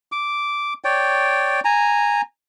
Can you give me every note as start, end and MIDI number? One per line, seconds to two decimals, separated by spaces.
0.12 0.74 86
0.84 1.60 73
0.84 1.60 74
0.84 1.60 79
1.65 2.21 80
1.65 2.21 82